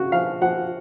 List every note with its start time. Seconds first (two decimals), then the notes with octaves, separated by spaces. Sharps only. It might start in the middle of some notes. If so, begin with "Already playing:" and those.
Already playing: C#3 F#4
0.12 F3 F5
0.41 F3 F#5